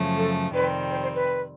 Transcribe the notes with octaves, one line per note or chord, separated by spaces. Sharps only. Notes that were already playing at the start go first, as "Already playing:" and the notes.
Already playing: F#2 C#3 F3 A3
A4
F2 C3 D#3 G3 C4 B4
C5
C5
B4